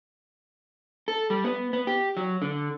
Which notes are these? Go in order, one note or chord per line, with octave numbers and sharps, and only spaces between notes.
A4
G3
B3
B3
G4
F#3
D3